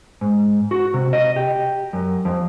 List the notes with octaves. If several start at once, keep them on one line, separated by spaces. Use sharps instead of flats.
G#2
F#4
C3
D#5
G4
F#2
F2